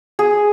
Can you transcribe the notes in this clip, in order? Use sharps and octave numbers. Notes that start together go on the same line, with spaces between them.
G#4